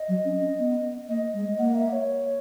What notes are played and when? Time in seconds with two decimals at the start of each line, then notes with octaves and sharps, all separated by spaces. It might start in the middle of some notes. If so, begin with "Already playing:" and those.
Already playing: D#5
0.08 F#3
0.25 C#4
0.41 C#4
0.59 B3
1.08 A#3 D#5
1.34 G#3
1.58 A#3 F#5
1.75 E5
1.92 C#5